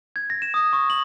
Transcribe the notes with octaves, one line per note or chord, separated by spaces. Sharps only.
G#6
A#6
E7
D#6
C#6
F#7